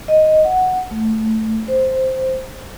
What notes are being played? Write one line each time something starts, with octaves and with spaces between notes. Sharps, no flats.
D#5
F#5
A3
C5